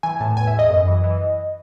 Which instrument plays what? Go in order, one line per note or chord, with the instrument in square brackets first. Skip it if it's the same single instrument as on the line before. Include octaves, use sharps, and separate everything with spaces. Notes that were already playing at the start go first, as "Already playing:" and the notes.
[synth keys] E3 G#5
A2 A5
E2 G#5
E5
E2 D#5
F#2
E3
E3